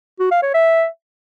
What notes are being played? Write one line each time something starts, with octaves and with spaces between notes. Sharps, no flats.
F#4
F5
C#5
E5